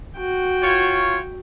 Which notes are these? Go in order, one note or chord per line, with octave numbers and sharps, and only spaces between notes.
F#4 G5
F4 C#5